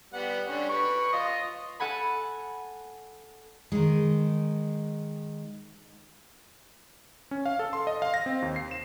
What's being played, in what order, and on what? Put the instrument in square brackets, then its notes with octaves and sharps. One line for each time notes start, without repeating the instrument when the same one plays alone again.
[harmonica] G3 B3 F#5
D3 G3 C#4
B4 C#6
F4 D#5
[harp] A4 F#5 G#5 B5
[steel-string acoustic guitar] D#3 G#3
[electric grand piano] C#4
F5
A4
C6
D#5
F5
A#6
C4
D#2
C7
E7